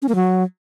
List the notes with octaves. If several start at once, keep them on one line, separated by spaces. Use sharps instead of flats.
C#4
A#3
F#3